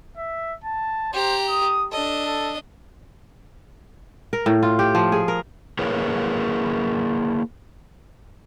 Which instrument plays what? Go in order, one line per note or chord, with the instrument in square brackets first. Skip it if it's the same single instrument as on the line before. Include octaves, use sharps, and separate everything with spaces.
[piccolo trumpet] E5
A5
[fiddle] G4 A#5 [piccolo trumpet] C5
[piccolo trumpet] D#6
[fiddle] D4 D#5 [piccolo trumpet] A4
[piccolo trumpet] A4
[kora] A#4
A2
F4
G4
F3
G#4
A#4
[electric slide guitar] A#3 E4 G#4 A#4 B4 C#5